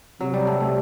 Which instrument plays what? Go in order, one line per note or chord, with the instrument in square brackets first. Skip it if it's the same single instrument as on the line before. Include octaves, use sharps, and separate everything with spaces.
[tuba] C3 [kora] F#3
[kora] G3
A3
A3